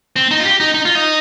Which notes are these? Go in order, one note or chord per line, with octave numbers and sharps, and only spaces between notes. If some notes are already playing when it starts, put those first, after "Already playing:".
C4
D#4
F4
G4
D#4
D#4
F4
D#4